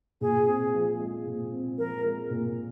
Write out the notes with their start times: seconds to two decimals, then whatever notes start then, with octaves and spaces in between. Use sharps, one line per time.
0.21 A#2 G#4
0.47 C4
0.74 F3
0.99 G#3
1.26 A#2
1.52 C4
1.78 F3 A#4
2.03 G#3
2.30 A#2